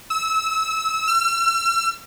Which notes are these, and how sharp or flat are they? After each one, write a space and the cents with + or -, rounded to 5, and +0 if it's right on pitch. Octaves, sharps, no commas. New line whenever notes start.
E6 -25
E6 +45